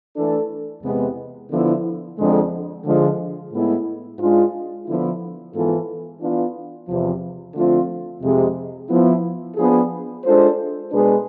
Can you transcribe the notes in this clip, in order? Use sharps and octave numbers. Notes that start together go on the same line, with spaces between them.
E3 A3 D4 A4
E2 C3 G#3 B3
D3 F3 B3 E4
F2 D3 G#3
D3 F3 G#3
A2 G#3 B3 E4
G#2 G#3 D4 F4
D3 F3 B3 E4
G#2 E3 B3 F4 A4
E3 B3 D4 F4
E2 C3 F3
D3 F3 A3 C4 F4
F2 C3 G#3
F3 B3 E4
F3 B3 D4 G#4
G#3 D4 F4 A4 C5
B2 G#3 D4 G#4 B4